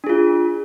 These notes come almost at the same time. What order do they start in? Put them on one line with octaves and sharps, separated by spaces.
D4 G#4 F4